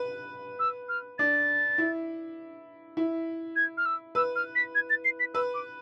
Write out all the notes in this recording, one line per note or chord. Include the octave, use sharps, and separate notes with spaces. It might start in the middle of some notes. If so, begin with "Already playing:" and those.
Already playing: B4
E6
F6
D4 A6
E4
E4
G#6
F6
E6
B4 E6
F6
B6
G#6
A6
C7
B6
B4 E6
D6